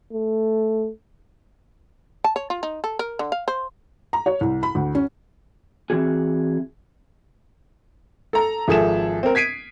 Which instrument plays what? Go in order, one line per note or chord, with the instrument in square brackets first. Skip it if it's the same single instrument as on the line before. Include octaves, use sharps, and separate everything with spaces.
[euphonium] A3
[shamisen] A5
C#5
F4
D#4
A4
A#4
D3
F5
C5
[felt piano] A#5
C#5
C2
B5
D2
C#4
[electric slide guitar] E3 C4 F#4 G#4
[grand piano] A4 A#5
G#1 F3 G#4 A4 E5 E7
C4 A#4
G#6 B6 C7 D7 D#7